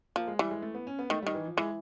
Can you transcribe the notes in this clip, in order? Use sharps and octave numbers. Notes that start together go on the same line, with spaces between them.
F3 A#3
G#3
E3 G3
G#3
A3
B3
C#4
B3
D#3 A3
D#3 G3
E3
F3
E3 G#3